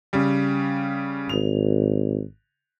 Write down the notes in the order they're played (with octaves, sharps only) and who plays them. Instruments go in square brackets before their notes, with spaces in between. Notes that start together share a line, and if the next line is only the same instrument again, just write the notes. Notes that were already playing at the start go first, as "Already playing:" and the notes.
[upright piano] C#3 G3
[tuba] G#1 [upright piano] F7